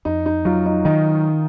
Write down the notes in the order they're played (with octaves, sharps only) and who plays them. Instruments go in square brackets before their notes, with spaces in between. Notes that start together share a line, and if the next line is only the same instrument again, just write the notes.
[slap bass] F2 [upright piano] D#4
[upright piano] D#4
[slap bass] F#3 [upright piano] F4
[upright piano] D#4
[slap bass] D#3 [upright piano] D#4